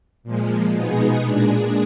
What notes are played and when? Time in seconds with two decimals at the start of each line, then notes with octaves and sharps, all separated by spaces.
0.23 A#2 F3 G#3
0.72 B2 G#3 B3 D#4 G#4
1.22 A#2 G#3 D4 G#4